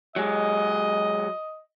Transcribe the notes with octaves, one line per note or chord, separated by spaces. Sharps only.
F#3 G#3 D#5